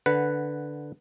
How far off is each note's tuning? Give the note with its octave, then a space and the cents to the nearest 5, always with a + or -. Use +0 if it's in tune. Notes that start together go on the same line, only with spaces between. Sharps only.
D3 +0 B4 +0 F#5 +0